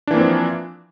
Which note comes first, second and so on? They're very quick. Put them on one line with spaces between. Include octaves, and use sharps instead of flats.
D4 E3 A#3 C4 F3